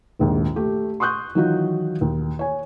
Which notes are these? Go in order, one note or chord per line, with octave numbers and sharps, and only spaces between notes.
A#1 D#2 G#2
A3 G4
C6 C#6 D#6 F#6 G6
D#3 E3 F#3 D#4 F4 F#4
D#2
C#5 G#5